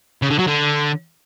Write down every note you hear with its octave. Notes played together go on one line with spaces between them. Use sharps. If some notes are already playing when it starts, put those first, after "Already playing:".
C#3
D3
F#3
D3